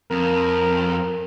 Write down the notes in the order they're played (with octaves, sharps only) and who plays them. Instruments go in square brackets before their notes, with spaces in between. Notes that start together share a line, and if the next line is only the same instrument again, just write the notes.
[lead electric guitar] F2 [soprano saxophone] A#4